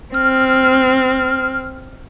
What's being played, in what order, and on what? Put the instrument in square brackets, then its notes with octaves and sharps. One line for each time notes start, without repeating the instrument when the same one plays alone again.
[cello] C4 [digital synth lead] F6